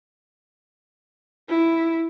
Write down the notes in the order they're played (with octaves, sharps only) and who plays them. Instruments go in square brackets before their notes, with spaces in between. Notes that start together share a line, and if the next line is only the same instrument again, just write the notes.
[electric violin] E4